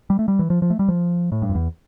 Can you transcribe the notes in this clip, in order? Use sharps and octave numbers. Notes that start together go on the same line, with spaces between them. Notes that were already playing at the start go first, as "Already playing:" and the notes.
G3
A3
G3
E3
F3
F3
A3
G3
F3
A2
G2
F2
E2